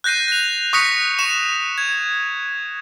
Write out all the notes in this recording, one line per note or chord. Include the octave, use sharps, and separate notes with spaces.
F#6 G6 A#6 C7 D#7
A#6 F7
C#6 D#6 F#6 A#6 B6 C#7
C#6 C#7 E7 F7
G#6